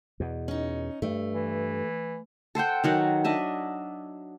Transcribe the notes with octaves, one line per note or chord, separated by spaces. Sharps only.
E2 B2
C#4 D#4
G2 A3
E3
A4 C5 F#5 G5
D#3 F#3 F#5
D4 D#5 E5